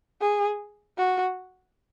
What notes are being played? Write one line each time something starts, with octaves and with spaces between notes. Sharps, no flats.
G#4
F#4